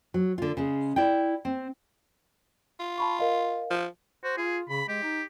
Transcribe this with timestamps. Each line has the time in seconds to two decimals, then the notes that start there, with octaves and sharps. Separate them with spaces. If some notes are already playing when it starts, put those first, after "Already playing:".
0.14 F#3
0.38 D3 F4
0.57 C#3 G#3
0.96 E4 D5 G5
1.45 C4
2.79 F4
2.98 A5 B5 C#6
3.19 A#4 D#5 F5
3.70 F3
4.24 F#4 C5
4.37 F4 G#4
4.69 C#3 B5
4.88 G#3 G4
5.03 D#4